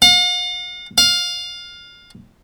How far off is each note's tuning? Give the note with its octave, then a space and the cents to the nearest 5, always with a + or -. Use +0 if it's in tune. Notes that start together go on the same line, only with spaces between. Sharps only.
F5 +45
F5 +20